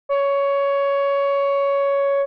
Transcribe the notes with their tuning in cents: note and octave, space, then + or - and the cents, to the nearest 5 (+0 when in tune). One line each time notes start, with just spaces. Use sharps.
C#5 +10